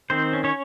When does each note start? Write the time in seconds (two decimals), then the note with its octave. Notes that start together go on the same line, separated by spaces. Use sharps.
0.10 D#3 C4 C5
0.33 C#4
0.44 C#4 C#5